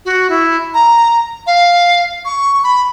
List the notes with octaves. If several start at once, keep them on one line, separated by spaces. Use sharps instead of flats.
F#4
E4
A#5
F5
C#6
B5